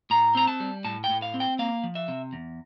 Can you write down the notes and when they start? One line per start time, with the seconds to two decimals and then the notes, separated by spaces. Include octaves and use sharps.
0.10 A2 A#5
0.35 C4 A#5
0.47 A5
0.60 G3
0.84 A2 A5
1.04 G5
1.10 A2
1.22 F5
1.34 C4
1.40 G5
1.59 A#3 F5
1.84 F3
1.95 E5
2.08 C3
2.33 E2